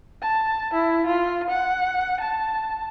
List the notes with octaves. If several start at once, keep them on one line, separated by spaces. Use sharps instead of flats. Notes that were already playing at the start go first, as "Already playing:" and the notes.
A5
E4
F4
F#5
A5